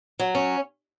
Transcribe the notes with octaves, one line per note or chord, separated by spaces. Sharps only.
F#3
C#4